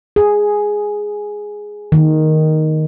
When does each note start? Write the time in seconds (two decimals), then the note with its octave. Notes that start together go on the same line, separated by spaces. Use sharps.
0.16 G#4
1.92 D#3